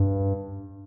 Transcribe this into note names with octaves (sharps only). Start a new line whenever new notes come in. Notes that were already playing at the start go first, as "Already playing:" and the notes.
Already playing: G2